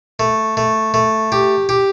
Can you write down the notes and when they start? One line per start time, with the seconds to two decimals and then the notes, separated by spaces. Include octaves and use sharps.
0.20 A3
0.57 A3
0.94 A3
1.32 G4
1.69 G4